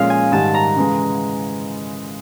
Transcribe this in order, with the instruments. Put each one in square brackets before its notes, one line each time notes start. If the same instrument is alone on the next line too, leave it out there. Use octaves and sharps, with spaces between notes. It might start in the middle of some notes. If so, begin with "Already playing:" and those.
Already playing: [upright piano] A#2 F3 G#3 C#4 [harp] F5
[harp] G#5
[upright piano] G#2 D#3 G3 [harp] A5
[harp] A#5
[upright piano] C#3 E3 G#3